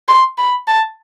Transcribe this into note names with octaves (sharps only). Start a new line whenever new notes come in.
C6
B5
A5